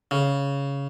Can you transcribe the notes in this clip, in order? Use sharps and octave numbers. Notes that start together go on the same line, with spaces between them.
C#3